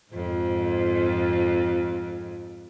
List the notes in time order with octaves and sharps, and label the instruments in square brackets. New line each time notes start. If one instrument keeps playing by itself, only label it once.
[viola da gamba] F2 G#2